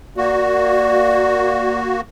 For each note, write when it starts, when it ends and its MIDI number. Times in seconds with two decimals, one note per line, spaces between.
0.17 2.01 58
0.17 2.01 66
0.17 1.78 74